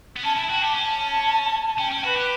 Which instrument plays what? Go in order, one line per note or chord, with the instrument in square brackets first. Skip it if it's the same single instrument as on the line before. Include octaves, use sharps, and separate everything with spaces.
[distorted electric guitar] B3
[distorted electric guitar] C#4 [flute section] A5
[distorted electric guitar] E4 [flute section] A5
[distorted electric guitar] F#4 [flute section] G5
[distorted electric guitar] G4 [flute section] A5
[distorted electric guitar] C#4 [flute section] A5
[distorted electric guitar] C#4 [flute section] G5
[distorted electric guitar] C#4
[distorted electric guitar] F#4 [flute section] B4
[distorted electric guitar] G4